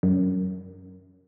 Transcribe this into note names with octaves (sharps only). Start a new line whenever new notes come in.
F#2